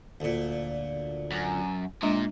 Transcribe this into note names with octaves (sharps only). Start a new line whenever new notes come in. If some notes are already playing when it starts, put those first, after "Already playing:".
D2 A#2
F#2
A#2 G#3 D4 D#5